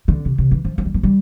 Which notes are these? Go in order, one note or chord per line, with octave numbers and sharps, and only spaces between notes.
D3
C3
C3
E3
F3
F3
G3
F3
G3